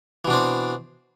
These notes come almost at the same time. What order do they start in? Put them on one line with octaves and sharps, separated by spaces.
E3 B2 D4 C4